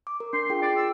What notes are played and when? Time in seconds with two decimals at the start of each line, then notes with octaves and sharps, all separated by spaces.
0.07 D6
0.20 A#4
0.33 D4 C6
0.50 F4 G#4 G5
0.62 D5
0.76 E6